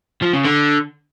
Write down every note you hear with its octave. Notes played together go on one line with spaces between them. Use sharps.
F3
C#3
D3